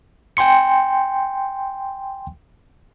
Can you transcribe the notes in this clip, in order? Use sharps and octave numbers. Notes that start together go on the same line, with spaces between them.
G5 G#5 C6 C#7